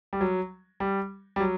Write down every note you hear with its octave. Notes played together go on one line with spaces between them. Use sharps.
G3
F#3
G3
G3
F#3